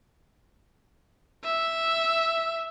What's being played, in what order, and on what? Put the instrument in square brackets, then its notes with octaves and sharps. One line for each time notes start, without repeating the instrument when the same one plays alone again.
[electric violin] E5